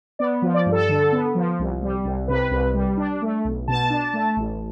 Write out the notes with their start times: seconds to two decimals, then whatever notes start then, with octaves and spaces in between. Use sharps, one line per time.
0.19 B3 D5
0.42 F3
0.54 D5
0.66 G2
0.72 A4
0.89 D3
1.12 B3
1.35 F3
1.59 C2
1.82 G3
2.05 C2
2.28 C3 B4
2.51 C2
2.74 G3
2.97 D4
3.22 A3
3.45 B1
3.68 B2 A5
3.90 D4
4.13 A3
4.37 A1